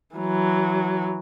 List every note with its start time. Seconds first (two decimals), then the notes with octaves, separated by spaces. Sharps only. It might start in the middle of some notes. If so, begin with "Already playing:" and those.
0.16 E3 F#3